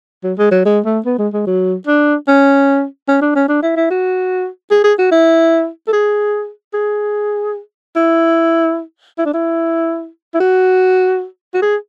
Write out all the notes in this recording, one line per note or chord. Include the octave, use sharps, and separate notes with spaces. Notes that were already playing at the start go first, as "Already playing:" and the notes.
F#3
G#3
F#3
G#3
A3
B3
G#3
G#3
F#3
D4
C#4
C#4
D4
C#4
D4
E4
E4
F#4
G#4
G#4
F#4
E4
A4
G#4
G#4
E4
E4
D4
E4
E4
F#4
F#4
G#4